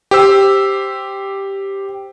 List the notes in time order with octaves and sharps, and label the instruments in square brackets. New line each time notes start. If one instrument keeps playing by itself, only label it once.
[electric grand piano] G4 C5 E6